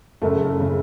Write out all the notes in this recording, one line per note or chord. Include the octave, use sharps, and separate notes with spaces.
F#1 F#2 C#3 A3
C#3